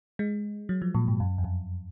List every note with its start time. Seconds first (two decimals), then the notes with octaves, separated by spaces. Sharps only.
0.19 G#3
0.69 F#3
0.82 F3
0.95 A#2
1.08 G#2
1.20 F#2
1.38 F2
1.44 F#2